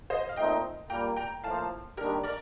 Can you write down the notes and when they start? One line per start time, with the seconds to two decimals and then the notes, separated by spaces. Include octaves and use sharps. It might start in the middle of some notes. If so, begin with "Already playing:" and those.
0.10 C5 D#5
0.29 F5
0.36 A#2 A3 C4 D#4 D#5 G5
0.90 A#2 G3 A#3 G5 A#5
1.17 G5 A#5
1.43 A2 F3 A#3 F5 A5
1.97 D#2 D#3 G3 D4 G4 A#4
2.23 A#4 D5